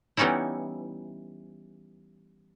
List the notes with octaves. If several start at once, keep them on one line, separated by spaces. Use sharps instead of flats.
E3 G3 B3 C#4 D#4 E4